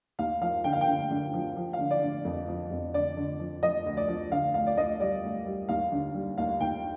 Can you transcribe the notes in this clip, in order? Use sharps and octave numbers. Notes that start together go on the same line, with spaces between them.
D#2 F5
F3 F5
D3 G5
F5
G5
D3
D3
F3
F3
F5
D3
D5
D3
F2
F3
F2
D3 D5
D3
F3
F3 D#5
D2
D5
F3
D3 F5
D2 F5
D5
D2 D#5
G3 D5
D2
G3
D#2 F5
D3
G3
D#2 F5
D#2 G5